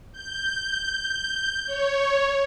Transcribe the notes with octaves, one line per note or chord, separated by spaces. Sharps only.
G6
C#5